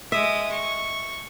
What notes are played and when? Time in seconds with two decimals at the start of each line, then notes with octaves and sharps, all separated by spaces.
0.12 G#3 E5 D#6
0.52 C#6